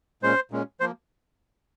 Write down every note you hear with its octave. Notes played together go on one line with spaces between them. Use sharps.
A#2 G#3 C#4 C5
A#2 G#3 C#4
F3 A#3 C5